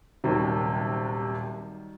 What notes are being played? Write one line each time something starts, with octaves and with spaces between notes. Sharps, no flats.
D#1 D#2 C3 D#3 F#3 G3